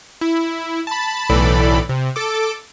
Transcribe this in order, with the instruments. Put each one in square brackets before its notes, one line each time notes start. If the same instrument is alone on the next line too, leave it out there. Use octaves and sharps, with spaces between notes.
[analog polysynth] E4
A5 B5
B1 A2 E3 A4 D5 B5
C3
A4 D6